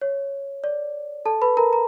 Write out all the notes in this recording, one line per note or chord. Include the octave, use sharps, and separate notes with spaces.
C#5
D5
A4 A5
B4 B5
A#4 A#5
A#5